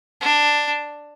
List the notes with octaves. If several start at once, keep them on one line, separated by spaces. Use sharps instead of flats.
D4